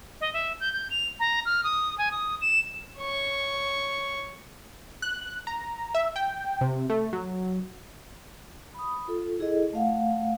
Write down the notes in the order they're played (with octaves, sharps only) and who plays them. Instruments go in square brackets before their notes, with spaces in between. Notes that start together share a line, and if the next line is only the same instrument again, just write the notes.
[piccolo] D#5
E5
G6
G6
F7
A#5
F6
D#6
G#5
D#6
E7
[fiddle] C#5 C#6
[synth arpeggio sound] F#6
A#5
E5
G5
C3
A3
F#3
[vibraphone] B5 D#6
F4 A4
E4 G#4 A4 D#5
A3 F5 F#5